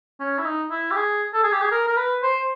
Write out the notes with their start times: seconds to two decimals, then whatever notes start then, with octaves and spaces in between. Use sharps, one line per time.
0.20 C#4
0.39 E4
0.46 D#4
0.71 E4
0.91 G4
0.96 G#4
1.34 A4
1.44 G#4
1.52 G4
1.62 G#4
1.72 A#4
1.88 A#4
1.97 B4
2.23 C5